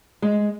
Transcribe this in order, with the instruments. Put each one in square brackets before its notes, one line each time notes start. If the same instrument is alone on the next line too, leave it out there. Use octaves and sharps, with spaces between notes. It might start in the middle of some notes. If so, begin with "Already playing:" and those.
[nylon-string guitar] G#3